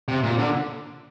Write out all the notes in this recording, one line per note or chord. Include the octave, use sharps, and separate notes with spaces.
C3
A#2
D3